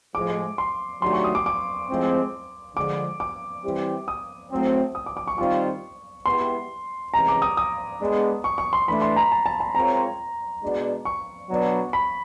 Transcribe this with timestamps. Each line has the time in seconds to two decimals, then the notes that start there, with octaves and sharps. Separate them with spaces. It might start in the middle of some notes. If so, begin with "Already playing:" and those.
0.15 A2 F3 G#3 D6
0.58 C6
1.01 D#3 F#3 A3 D4 G4 C6
1.13 C#6
1.24 D#6
1.35 D6
1.46 D6
1.90 A2 F3 G#3 C4
2.76 D3 F3 G#3 D6
3.20 D6
3.64 E3 G3 C4 E4 G4
4.08 D#6
4.51 A2 F#3 A3 C4
4.95 D#6
5.06 D6
5.17 D6
5.27 C#6
5.38 D#3 G3 C4 F4 C#6
6.26 G#3 B3 E4 G4 C6
7.13 C3 E3 G#3 C#4 A#5
7.28 D6
7.42 D#6
7.57 D#6
8.00 G#3 B3 D4
8.44 C#6
8.58 C#6
8.73 C6
8.88 E3 A3 D4 B5
9.02 C6
9.16 A#5
9.32 A5
9.46 A5
9.60 A5
9.75 G#3 C4 F4 A#4 C#5 A#5
10.62 B2 G#3 B3 D4
11.05 C#6
11.49 B2 F#3 B3 D4
11.93 B5